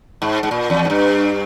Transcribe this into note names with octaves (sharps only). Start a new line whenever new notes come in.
G#2
G#2
A#2
E2
G#2
G2